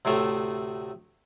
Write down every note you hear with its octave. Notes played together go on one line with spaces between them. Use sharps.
D2 A2 C3 A3